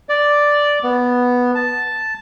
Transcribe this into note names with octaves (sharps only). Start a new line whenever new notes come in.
D5
B3
A5